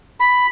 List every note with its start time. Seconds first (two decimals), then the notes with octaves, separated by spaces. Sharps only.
0.20 B5